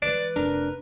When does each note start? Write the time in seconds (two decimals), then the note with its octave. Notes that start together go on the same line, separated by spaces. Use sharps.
0.02 E3 G#3 B4 D5
0.36 F1 D4 A#4